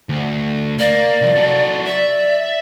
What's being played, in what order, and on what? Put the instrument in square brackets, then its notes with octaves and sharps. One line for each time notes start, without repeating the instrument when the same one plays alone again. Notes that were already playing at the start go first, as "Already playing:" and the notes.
[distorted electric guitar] D2
[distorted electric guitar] A#3 [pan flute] D5
[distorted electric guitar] C2 F2
F#3 A4
[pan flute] D5 [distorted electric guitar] E5